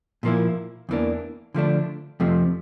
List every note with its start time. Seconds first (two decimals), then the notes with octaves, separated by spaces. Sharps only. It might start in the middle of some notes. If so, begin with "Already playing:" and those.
0.23 A#2 F3 A#3 E4
0.89 E2 E3 A#3 D4
1.54 D3 F3 A3 D4
2.20 F2 C3 F3 A3